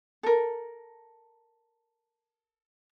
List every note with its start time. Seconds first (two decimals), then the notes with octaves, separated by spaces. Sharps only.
0.23 A4 A#4